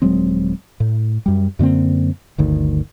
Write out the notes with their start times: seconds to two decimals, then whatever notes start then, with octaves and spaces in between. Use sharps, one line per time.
0.02 D#1 F#3 G#3 C4
0.80 A2
1.26 F#2 G3
1.59 F#2 D3 A#3 C4
2.38 G1 D2 D#3